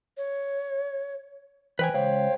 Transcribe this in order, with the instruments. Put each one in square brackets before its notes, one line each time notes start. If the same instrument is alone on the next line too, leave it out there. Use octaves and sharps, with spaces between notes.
[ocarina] C#5
[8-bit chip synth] E3 [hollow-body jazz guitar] B4 G5 G#5 [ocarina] C5
[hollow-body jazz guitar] C#2 [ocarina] C5 [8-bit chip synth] C#5 F5 G5